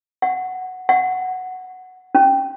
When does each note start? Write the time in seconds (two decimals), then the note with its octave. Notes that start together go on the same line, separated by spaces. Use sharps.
0.22 F#5
0.89 F#5
2.15 C#4